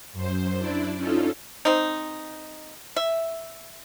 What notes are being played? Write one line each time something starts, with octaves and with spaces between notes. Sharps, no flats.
F#2 C5
D4 E4 D5
C#4 D#4 F4 A4
C4 D#4
E5